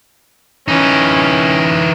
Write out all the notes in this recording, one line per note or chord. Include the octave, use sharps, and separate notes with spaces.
E3 C#4 D#4